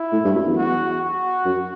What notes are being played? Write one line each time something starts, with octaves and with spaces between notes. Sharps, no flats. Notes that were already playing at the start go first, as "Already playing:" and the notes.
Already playing: E4
A2
G2
F#2
E2
F#4
F#4
F#2